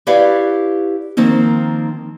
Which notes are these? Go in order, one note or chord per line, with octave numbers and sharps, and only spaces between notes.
E4 G4 B4 C#5 D5 F5
D#3 F3 A#3 C4 D#4